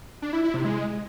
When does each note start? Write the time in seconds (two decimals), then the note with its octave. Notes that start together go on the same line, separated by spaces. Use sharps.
0.22 D4
0.33 E4
0.43 E4
0.54 C3
0.65 G#3